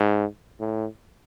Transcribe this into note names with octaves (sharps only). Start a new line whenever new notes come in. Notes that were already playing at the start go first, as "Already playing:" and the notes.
Already playing: G#2
A2